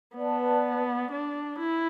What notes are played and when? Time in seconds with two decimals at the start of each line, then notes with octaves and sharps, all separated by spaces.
0.17 B3 B4 D5 A5
1.12 D4
1.59 E4